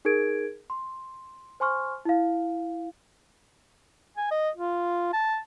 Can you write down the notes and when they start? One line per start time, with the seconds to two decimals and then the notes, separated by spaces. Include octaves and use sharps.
0.05 D#4 G#4 A#4 G#6 D7
0.70 C6
1.60 C5 G#5 C6 C#6 F6
2.05 E4 F5
4.17 G#5
4.31 D#5
4.57 F4
5.13 A5